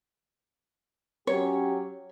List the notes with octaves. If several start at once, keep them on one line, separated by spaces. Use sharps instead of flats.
F#3 C#4 G4 C#5